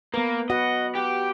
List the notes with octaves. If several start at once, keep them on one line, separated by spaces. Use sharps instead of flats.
A#3 B3 B4
F#4 B4 D#5 F#5
G4